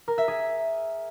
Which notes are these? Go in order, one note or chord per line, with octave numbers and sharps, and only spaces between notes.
A#4
E5
G#4